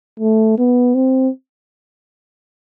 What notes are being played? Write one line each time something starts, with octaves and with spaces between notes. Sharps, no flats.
A3
B3
C4